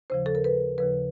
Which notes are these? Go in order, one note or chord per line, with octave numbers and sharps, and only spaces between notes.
D#2 C#3 F3 C5
A4
A#4
B4
D#2 C#3 F3 B4